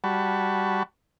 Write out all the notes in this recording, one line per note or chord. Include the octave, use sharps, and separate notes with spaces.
G3 F#4 A5 B5 C#6